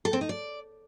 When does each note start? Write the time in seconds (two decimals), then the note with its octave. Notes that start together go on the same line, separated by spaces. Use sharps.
0.05 A4
0.13 C4
0.21 D#4
0.29 D5